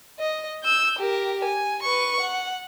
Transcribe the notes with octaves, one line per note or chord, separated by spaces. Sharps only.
D#5
E6 G6
G4 A#4
G#5
B4 C#6
F#5